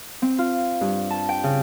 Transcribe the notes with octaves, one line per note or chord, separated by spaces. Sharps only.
C4
F4
G2
A5
G5
C#3